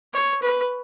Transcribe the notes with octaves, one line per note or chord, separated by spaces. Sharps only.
C#5
B4